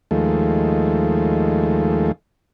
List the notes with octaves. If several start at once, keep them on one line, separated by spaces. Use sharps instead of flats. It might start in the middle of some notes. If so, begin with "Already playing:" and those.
D#2 F3 G#3 A3